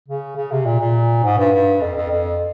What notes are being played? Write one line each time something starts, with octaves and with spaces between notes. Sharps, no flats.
C#3
C#3
C3
A#2
A#2
G#2
G2
G2
F2
F2
F2